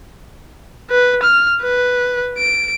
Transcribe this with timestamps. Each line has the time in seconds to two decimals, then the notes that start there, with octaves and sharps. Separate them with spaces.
0.90 B4
1.23 F6
1.61 B4
2.38 D7